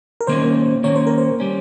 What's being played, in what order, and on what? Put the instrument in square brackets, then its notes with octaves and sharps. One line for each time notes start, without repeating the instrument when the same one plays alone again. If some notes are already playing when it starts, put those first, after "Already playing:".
[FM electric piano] A#4
[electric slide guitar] D#3 A#3 C#4 [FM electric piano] C5
[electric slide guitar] D#3 A#3 C#4 [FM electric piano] C#5
[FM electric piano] C5
A#4
C5
[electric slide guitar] G3 C#4